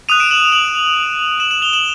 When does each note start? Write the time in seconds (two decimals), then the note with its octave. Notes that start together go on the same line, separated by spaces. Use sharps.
0.09 D#6 F#6 D#7 F7
0.20 D7 E7
0.31 E7 F#7
0.52 E7 F#7
1.40 E7 F#7
1.51 E7 F#7
1.62 F7 G7
1.73 E7 F#7